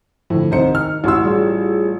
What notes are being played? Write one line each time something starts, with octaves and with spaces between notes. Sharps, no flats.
A2 D3 F3
C2 D#3 D#4 C5 C#7
F6
A1 E4 F#4 C6 E6
G3 F4 G#4